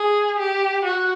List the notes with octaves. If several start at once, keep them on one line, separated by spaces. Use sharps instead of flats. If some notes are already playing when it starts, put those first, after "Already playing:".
Already playing: G#4
G4
F#4